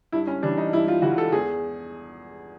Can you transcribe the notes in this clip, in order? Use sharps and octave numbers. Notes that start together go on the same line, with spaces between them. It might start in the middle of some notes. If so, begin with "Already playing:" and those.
G2 E4
C#4
E3 G3 D4
D#4
G2 E4
F4
E3 G3 F#4
A4
E2 G#4